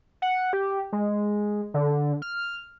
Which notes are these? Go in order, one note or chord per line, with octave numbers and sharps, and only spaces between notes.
F#5
G4
G#3
D3
F6